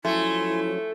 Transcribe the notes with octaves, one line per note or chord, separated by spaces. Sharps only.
F3 F#3 A3 C#4 E4 G#5 C6